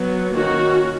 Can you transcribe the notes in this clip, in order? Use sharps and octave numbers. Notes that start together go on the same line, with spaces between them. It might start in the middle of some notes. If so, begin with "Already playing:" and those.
Already playing: F#3 B3
D#3 A#3 C#4 F#4